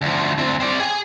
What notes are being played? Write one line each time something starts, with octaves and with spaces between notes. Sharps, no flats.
D2 F3
D2 C4
C4 D5
G#4 G#5